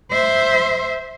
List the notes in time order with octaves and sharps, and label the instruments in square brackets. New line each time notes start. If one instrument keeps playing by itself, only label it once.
[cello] C5 E5